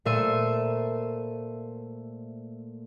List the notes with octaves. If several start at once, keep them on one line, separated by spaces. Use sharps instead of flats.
A#2 A3 C5 E5 C7 D#7